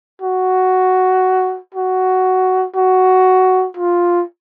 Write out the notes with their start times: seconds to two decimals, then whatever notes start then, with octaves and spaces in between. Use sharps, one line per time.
0.22 F#4
1.75 F#4
2.75 F#4
3.77 F4